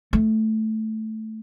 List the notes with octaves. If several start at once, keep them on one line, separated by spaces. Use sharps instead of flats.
A3